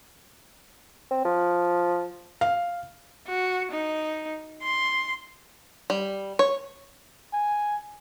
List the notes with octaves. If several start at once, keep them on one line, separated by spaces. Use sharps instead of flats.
C4
F3
F5
F#4
D#4
C6
G3
C#5
G#5